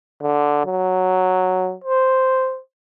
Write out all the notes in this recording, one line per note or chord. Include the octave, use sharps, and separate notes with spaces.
D3
F#3
C5